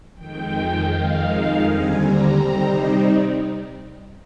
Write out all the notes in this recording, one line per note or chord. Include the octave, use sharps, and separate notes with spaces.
F2 D#3 G#3 G5
F2 D#3 G#3 D#4 F5
D#2 D3 G3 C4 G#5
A#5
C3 G3 C4 D#4